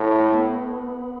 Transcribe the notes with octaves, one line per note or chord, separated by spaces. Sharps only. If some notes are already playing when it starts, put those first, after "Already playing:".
Already playing: A2
A3
B3